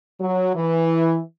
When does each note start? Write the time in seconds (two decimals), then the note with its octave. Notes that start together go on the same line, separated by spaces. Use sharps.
0.20 F#3
0.55 E3